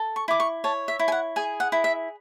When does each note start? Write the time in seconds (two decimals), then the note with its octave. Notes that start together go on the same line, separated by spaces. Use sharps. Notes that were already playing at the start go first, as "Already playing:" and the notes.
Already playing: A4
0.16 C#6
0.28 E4 D6
0.40 C#6
0.64 C#5 A5
0.88 E5
0.99 E4
1.08 G#5
1.12 F#5
1.36 G#4 G#5
1.60 F#5
1.72 E4
1.84 E5